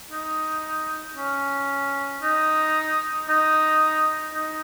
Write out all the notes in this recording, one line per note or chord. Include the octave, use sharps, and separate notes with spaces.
D#4
C#4
D#4
D#4
D#4